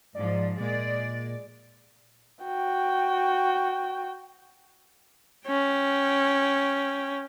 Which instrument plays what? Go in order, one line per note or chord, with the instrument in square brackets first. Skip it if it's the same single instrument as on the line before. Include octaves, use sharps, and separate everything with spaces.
[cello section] G#2 F3 [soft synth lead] D5
[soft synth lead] A#2 [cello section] G#3 D5
[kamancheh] F#4 G5
[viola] C#4 G5